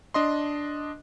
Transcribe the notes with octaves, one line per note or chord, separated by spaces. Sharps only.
D4 D#5 C6